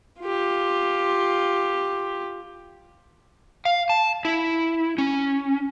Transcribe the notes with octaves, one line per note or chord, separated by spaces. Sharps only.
F4 G4
F5
A5
E4
C#4